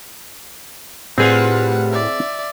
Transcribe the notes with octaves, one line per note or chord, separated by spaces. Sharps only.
A2 G3 C4 F4 G#4 B4 F#5
D5 E5